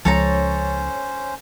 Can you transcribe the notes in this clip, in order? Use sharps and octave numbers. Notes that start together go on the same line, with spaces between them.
C#2 F3 C#4 A4 C5 C#5 A#5